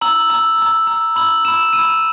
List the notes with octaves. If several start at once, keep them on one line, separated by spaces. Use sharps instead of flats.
A#5 E6 F#7
A#5 E6
A#5 E6
A#5 E6
B5 E6 F#7
B5 E6 E7
E6 D#7
B5